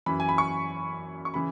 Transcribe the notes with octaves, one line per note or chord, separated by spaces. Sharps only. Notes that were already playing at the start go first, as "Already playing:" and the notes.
F#2 E3 B5
G#5
B5
C#6
C#6
C#3 E3 B5